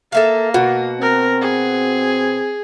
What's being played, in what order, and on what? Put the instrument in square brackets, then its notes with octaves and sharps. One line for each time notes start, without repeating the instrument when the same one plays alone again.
[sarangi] A#3 [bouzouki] A4 E5 F5
[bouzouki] B2 [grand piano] F#4
[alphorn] C4 [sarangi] A#4
[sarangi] G#4